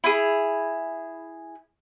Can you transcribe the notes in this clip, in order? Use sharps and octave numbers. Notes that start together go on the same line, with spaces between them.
E4 G#4